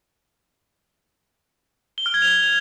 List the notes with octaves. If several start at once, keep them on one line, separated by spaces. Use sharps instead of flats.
G7
F6
G#6
F7